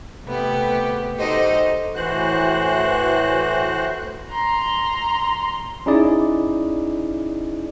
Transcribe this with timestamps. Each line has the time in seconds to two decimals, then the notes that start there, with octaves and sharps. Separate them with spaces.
0.25 C3 A3 B3 G4
1.18 D#4 F#4 G4 A4 C5 D#5
1.95 A2 E3 F#4 C5 F#6
4.30 A#5 C6
5.86 C#4 D#4 E4 G#4 D5